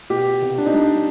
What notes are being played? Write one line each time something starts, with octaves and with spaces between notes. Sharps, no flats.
B2 G4
C2
D4
D#4
G3 D4